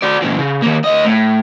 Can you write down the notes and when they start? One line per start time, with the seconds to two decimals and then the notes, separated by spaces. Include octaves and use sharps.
0.03 F#4 D5
0.22 A#2 E3
0.39 C#3
0.62 D#3 A#3
0.84 D2 D#5
1.05 A2